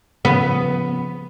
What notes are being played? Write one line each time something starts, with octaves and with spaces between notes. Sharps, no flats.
C#3 F3 B3